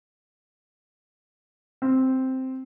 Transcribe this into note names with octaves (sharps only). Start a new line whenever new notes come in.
C4